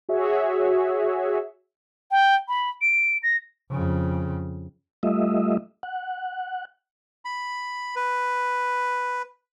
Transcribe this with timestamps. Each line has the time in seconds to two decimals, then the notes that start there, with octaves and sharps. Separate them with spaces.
0.09 F#4 G#4 C#5 E5
2.11 G5
2.48 B5
2.82 D7
3.23 A#6
3.71 F2 C#3
5.03 G3 A3 F4 D#5 E5
5.83 F#5
7.25 B5
7.96 B4